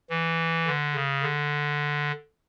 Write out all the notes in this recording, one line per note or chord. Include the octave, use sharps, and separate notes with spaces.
E3
D3
C#3
D3